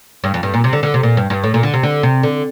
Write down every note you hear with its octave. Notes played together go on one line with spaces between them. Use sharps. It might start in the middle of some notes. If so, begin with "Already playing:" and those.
G2
F2
G2
A#2
C3
D3
D3
C3
A#2
G2
G2
A2
A#2
D3
C3
D3
C3
D3